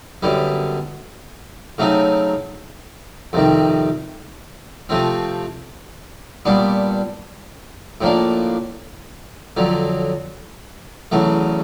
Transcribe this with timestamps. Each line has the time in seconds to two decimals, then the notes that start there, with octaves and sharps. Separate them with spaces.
0.23 F#2 D3 G3 B3
1.78 C#3 F#3 A3 C4 D#4
3.33 F2 C3 D#3 G3
4.89 C3 F3 A3 C4
6.45 A#2 G3 B3 D4
8.01 A2 F3 A#3 D4
9.57 F2 D3 F#3
11.12 E2 C#3 F#3 A3